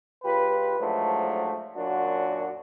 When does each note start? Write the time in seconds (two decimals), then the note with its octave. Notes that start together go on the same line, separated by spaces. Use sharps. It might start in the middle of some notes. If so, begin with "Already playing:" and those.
0.23 C#2 F4 G4 B4
0.79 G#2 F3 F#3 A3 D4
1.76 F#2 A#2 D4 F#4